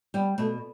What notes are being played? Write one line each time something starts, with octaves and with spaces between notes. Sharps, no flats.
G3 B3
B2 A3